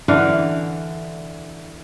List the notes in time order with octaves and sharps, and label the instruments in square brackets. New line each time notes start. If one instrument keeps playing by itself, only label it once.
[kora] D3 E3 F5 F#5